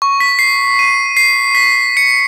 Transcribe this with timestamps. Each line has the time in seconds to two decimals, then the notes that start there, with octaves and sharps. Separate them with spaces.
0.02 C#6
0.20 B6
0.39 C7
0.79 D#7
1.17 C7
1.55 B6
1.97 C#7